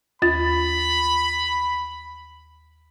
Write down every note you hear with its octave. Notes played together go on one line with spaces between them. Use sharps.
D#2 F4 B5 A6